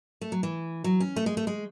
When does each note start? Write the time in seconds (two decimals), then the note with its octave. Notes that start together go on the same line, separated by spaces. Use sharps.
0.21 A3
0.32 F#3
0.43 E3
0.84 F#3
1.00 C#4
1.16 A3
1.26 G#3
1.37 A3
1.47 G#3